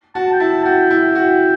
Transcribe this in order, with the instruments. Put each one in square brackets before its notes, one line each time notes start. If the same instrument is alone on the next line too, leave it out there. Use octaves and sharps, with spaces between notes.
[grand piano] F#4 [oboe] A5
[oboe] G5
[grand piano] E4 [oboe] A5
[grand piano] F#4 [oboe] G5
[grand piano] E4
F#4